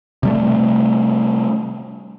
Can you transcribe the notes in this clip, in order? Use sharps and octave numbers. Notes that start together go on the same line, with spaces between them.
C3 G3 A3